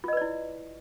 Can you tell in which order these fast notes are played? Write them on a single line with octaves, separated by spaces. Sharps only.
F4 D#5 B4 D5 E4